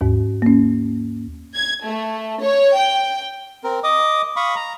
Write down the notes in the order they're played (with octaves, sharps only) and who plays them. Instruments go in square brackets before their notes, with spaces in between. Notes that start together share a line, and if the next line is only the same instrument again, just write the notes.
[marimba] D#2 G#2
A#3 C#4
[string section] G#6
A3
C#5
G5
[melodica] C4 A#4
D#5 D6 D#6
F5 B5 C#6 D#6
A#5